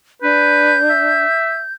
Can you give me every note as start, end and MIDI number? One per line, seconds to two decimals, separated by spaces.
0.22 1.25 62
0.22 0.77 71
0.22 1.73 91
0.89 1.62 76